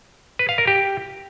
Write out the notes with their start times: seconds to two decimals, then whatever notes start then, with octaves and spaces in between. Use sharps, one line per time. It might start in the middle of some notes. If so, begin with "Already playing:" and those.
0.39 B4
0.49 F5
0.58 A#4
0.67 G4